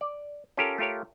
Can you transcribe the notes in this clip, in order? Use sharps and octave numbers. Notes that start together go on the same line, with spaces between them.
D5
C#4 F4 G4 A4 A#4
A3 F4 G4 A#4 C#5